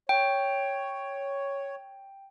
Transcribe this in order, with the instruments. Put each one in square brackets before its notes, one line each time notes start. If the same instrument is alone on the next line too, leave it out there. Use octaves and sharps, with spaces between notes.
[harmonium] C#5 [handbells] G5